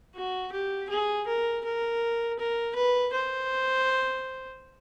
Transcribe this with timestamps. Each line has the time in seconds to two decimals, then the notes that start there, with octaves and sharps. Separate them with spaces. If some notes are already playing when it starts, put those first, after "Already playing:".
0.15 F#4
0.52 G4
0.90 G#4
1.27 A#4
1.65 A#4
2.39 A#4
2.76 B4
3.13 C5